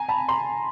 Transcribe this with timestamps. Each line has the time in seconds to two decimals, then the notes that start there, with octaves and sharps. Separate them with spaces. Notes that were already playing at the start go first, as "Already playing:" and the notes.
Already playing: G#5 A#5
0.08 A5 B5
0.28 A#5 C6